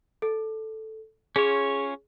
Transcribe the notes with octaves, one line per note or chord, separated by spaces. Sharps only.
A4
C#4 F4 G#4 C#5